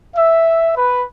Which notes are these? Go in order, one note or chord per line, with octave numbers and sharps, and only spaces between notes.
E5
B4